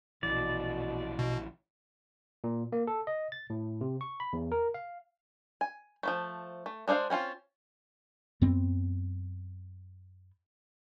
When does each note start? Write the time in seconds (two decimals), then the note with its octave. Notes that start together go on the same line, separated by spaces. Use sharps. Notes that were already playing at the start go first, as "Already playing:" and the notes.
0.23 A#1 B2 E3 D5
1.19 B2
2.44 A#2
2.72 A#3
2.87 A4
3.07 D#5
3.32 A6
3.50 A2
3.81 C3
4.01 C#6
4.20 B5
4.33 E2
4.52 A#4
4.74 F5
5.61 G#5
6.03 F3 F#3 A3
6.66 A3
6.88 G#3 D4 F4 C5 F5
7.10 C4 C#4 D#4 F4
8.41 F#2 B3 C4